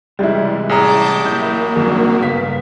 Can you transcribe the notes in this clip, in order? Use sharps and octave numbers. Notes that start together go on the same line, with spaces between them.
C#2 C3 E3 G3 G#3 E4
A1 G#4 A5 A#5 D6 G6
F#3 A#3 E4 G6
G#1 F#2 G3 D4
G2 C#3 B3 A#4 F5 B6